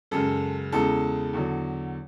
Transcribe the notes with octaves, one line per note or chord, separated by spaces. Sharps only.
F#2 C#3 G#3 A4
E2 C#3 G#3 A4
E2 D3 F#3